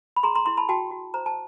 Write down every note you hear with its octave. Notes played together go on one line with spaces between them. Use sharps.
B5
G#4 A#5 C6
A#5 C6
E4 A#5 C6
A5 B5
F#4 G5 A5
F#4
C5 A#5
A5